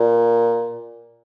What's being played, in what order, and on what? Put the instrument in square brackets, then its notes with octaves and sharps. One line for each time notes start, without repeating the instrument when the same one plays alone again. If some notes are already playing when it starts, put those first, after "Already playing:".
Already playing: [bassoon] A#2